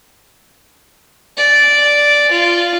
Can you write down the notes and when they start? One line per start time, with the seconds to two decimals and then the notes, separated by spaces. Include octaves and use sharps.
1.37 D5
2.31 F4